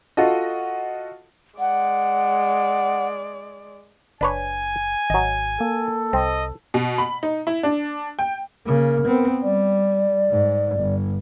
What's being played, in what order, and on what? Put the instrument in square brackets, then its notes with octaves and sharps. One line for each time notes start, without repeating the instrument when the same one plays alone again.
[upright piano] F4 F#4 A4 D#5
[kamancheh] G#3 D5 [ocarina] F#5
[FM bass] F#1 [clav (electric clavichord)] D4 B4 C#5 [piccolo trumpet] G#5
[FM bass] G#1 [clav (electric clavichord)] F#3 D#5
[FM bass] A#3 [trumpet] A4
[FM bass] C2 [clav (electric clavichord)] C4 [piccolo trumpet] D#5
[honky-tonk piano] B2
B5
D#4
E4
D4
G5
[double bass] C#3 A#3 [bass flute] A#4
[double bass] B3 C4
[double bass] G3 [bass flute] D5
[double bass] G#2
G1